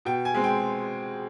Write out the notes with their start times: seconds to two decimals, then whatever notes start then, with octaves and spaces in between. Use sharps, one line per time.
0.05 B2 G5
0.25 G#5
0.34 G#3 C4
0.44 G5